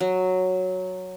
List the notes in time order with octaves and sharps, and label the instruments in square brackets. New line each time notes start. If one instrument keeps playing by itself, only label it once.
[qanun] F#3